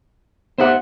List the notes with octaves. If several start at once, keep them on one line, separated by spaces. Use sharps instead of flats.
B3 D#4 G4 C5 E5 F#5